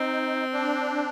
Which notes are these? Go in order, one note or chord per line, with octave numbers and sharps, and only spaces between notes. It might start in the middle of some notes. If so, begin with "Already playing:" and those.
Already playing: C4 D#4
D4